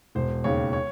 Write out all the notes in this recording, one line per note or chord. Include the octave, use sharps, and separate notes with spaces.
E1 C5
D#2 C#3 C#5
C#5